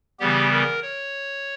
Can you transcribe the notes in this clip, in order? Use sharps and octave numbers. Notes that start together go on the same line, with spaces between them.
C#3 E3 G3 B3 G4
A#4
C#5